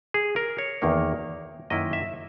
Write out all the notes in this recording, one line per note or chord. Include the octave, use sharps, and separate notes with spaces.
G#4
A#4
C#5
E2 D#3 A#3 D#4
F#2 D#3 A#3 E4 D#5
E5